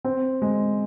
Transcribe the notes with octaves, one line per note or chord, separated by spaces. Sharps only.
C4
G#3